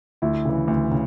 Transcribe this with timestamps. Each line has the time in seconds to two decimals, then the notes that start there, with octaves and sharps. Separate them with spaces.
0.22 D2 E4
0.45 C#3 E3
0.68 D2
0.91 C#3